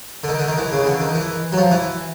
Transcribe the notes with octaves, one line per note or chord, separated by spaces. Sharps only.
D3
D#3
D3
D#3
E3
C#3
D3
D#3
E3
F#3
F3
E3